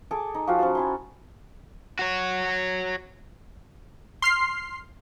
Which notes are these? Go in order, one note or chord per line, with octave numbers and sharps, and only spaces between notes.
G#4 A4 G#5 D6
D#4
F3 F#4 G4 F5
C#4 C5 F#5 A5
C#4 E4 C6
F#4 C#5
C6 F6 C7